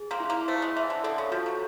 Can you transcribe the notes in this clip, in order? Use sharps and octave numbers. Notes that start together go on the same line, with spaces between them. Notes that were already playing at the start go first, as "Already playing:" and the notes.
Already playing: G#4
A#3 C4
E4
A#3
A3 C5
G#3
E3 E5
D3
D3 A4
C#3
F3 F#4
F#3